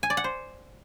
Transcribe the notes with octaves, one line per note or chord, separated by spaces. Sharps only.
G#5
D5
F#5
C5